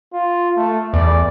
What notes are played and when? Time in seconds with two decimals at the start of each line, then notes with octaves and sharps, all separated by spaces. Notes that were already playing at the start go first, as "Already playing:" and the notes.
0.13 F4
0.57 A3
0.94 E2 D5